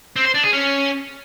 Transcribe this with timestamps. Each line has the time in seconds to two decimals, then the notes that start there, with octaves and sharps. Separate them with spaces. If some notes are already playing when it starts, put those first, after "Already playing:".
0.16 C4
0.25 C5
0.35 D4
0.44 G#4
0.53 C#4